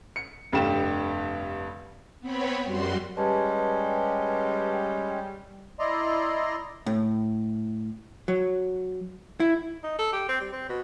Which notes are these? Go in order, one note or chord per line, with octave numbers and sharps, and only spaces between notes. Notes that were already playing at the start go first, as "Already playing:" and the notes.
C#7
F1 G2 D3 G3 G4 E7
B3 C4 B4 C#5
F#2 G3 F#4 C6
G3 G#3 C#4 B4 A5
E4 D5 D#5 A#5 C6
A2
F#3
E4
D#4
A4
G4
C4
G3
C4
B2